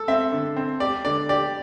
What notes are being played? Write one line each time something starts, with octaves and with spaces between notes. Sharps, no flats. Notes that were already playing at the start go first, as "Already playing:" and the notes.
Already playing: A4
C4 E5
D3
C4
G4 D5
D3 D5
G4 D5